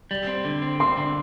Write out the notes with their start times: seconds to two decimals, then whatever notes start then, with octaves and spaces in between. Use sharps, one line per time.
0.11 G3
0.27 C4
0.45 D3
0.62 C4
0.80 C4 C6
0.97 D3